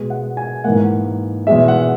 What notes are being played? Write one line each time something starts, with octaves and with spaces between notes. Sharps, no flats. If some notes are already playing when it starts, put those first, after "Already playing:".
Already playing: B2 G#3 B3
F#5
G#5
G#2 E3 A#3 F#5
E2 B2 G#3 E5
F#5